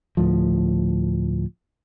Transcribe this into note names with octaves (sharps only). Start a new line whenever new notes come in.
D2 A2 F3